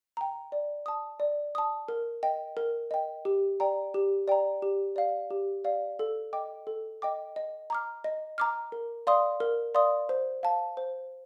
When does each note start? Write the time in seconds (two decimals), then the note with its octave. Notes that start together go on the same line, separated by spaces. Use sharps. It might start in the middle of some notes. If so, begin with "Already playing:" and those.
0.17 G5 A#5
0.52 D5
0.86 A5 D#6
1.20 D5
1.55 A5 D#6
1.88 A#4
2.23 D#5 G5
2.57 A#4
2.91 D#5 G5
3.25 G4
3.60 D5 G5 A#5
3.94 G4
4.28 D5 G5 A#5
4.62 G4
4.96 D5 F5
5.30 G4
5.65 D5 F5
5.99 A4
6.33 D#5 G5 D6
6.67 A4
7.02 D#5 G5 D6
7.36 D#5
7.70 A#5 D6 F6
8.04 D#5
8.38 A#5 D6 F6
8.72 A#4
9.07 D5 F5 C6 D#6
9.40 A#4
9.75 D5 F5 C6 D#6
10.09 C5
10.43 F5 A5
10.77 C5